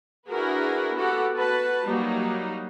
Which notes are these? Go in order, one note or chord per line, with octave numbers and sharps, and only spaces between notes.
D4 E4 F#4 G#4 A#4 B4
B3 F#4 G4 A4 F#5
F#4 B4 A5
F#3 G3 A#3 D#4